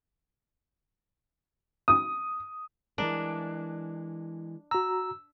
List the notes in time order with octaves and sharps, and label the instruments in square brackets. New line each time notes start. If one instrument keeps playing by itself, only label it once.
[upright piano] D#6
[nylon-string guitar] E3 G#3 A#4 [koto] D4
[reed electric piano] F#4 A#5 [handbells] E6